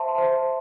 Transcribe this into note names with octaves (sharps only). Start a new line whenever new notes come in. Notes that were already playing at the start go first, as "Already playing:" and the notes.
Already playing: C5 E5 A5 C6
C5